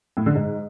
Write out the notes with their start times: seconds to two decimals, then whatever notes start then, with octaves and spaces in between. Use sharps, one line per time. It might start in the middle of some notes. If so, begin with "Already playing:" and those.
0.17 A2
0.26 D3
0.35 G#2